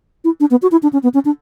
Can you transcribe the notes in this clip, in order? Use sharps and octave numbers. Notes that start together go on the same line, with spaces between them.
E4
D4
B3
F#4
E4
D4
C#4
B3
C#4
D4